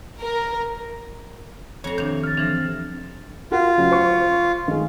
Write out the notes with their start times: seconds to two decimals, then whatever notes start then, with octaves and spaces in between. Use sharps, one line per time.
0.21 A#4
1.84 F2 C4 C#5 A#5
1.98 C3 D#3 D4
2.24 F6 A6
2.38 E3 F3 C4 D4
3.52 F4 F#4 A#4 F#5
3.78 C#3 F#3
3.91 C5 C#6
4.68 D#3 G#3